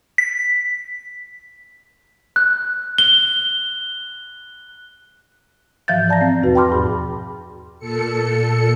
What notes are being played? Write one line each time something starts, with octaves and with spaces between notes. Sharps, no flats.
B6
F#6
G7
G#2 E3 F3 F5 G6 A6
F3 D5 A5 A#5 A#6
C4
E2 B2 F#4 B4
G5 A5 B5 C6 D6 F6
E2 G#2 G#4 B5
A#2 A4 C#7